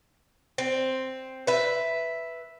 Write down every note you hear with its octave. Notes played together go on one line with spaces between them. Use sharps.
C4
B4 E5